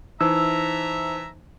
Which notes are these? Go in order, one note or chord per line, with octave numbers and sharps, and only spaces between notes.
E3 D#4 C5 E5 A5 A#5 E6